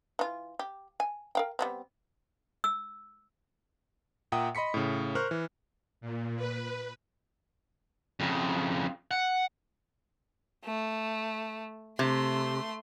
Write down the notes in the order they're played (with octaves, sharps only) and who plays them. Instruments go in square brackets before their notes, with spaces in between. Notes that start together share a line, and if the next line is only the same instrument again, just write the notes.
[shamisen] E3 F4
G4
G#5
A#4 F5 G5
G3 B3 C4
[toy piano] E6
[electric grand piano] A#2 E5 F#5 G5 A#5 D#6
D#5 B5 C6 B6 C#7
A2 C#3
A#4 C5 C#6 F6 F#6
E3
[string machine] A#2
B4
[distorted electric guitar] F2 C#3
F#5
[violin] A3
[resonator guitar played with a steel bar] C3 [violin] A3 C6